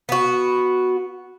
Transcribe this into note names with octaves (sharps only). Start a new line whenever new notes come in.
B3 F#4